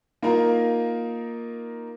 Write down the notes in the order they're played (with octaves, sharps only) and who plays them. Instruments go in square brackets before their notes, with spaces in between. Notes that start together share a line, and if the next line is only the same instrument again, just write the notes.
[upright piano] A#3 D#4 F4 A#4